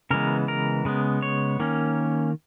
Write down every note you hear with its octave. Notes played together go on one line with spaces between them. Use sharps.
C#3 E3 G#3 B3 A#4
A#4
C#3 G#3 B3
C#5
D#3 A#3 C#4